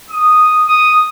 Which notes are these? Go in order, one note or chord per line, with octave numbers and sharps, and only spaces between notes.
D#6
D#6